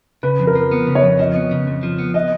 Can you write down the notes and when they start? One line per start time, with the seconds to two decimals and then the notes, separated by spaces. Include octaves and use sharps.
0.23 C#3 B4
0.39 F2
0.47 A#4
0.55 F3
0.71 B3
0.87 C#3
0.95 C#5
1.03 F2
1.19 F3 D#5
1.35 B3
1.51 C#3
1.67 F2
1.83 F3
1.98 B3
2.14 B3 D#5